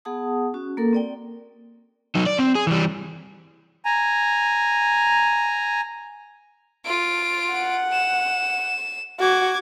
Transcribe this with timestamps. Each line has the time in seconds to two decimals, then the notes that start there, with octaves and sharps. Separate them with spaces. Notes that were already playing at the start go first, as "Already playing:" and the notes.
0.05 B3 G#4 F#5 A5 D#6
0.54 C#4 F#4
0.77 A#3 A4 A#4
0.93 C4 D5 G5
2.15 F#3 D#4
2.26 D5
2.39 C4
2.55 G#4
2.67 E3 G3
3.85 G#5 A#5
6.85 F4 D7
7.53 F#5
7.93 E7
9.20 F#4 D6 G#6